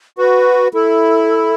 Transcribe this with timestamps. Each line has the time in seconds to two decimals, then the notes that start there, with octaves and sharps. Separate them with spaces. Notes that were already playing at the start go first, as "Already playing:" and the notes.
0.18 F#4 B4
0.74 E4 A4